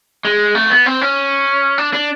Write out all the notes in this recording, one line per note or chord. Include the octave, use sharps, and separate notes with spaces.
G#3
A3
B3
C4
C#4
D4
D4